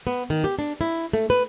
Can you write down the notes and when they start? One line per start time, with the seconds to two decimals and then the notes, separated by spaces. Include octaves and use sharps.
0.07 B3
0.30 D#3
0.44 G4
0.59 D4
0.81 E4
1.13 A3
1.30 B4